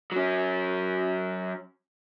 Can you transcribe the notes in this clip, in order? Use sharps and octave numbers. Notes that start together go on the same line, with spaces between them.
F#3 C#4